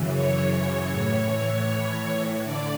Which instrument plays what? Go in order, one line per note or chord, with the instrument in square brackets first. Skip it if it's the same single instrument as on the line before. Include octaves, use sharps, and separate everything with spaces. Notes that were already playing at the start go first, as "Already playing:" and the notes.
Already playing: [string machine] F#2 C#3 E3
C#5
A2 E3
D3 D5